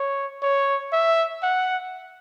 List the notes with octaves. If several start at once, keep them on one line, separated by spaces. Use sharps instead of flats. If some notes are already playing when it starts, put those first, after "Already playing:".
Already playing: C#5
C#5
E5
F#5